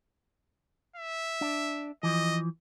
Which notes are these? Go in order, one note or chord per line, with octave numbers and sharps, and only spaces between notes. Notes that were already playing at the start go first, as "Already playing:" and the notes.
E5
D4
E3 F3 D#5